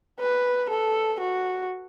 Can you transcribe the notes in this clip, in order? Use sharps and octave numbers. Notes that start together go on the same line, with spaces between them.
B4
A4
F#4